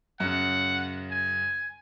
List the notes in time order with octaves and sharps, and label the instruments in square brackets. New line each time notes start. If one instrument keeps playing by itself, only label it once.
[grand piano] F#2 C#3 [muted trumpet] F#5
[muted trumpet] G#5